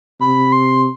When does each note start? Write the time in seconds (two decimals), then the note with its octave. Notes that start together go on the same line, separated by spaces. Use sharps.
0.20 C3 B5
0.52 C6